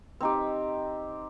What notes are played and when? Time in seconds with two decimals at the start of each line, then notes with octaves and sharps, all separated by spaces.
0.21 C4 D#4 G4